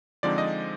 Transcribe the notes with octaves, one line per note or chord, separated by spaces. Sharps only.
D3 F3 G#3 C4 D#4 D5
D#5